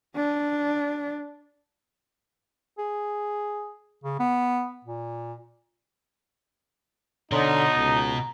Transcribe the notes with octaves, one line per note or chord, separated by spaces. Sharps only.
D4
G#4
C#3
B3
A#2
B2 D3 D#4 C#5 A#5 C6
C#2 A#5